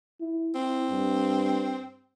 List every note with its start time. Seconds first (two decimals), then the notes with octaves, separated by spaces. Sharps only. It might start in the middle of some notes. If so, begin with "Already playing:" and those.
0.20 E4
0.55 C4 E4
0.91 G2